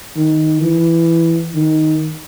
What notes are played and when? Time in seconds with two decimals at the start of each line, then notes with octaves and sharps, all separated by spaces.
0.16 D#3
0.62 E3
1.55 D#3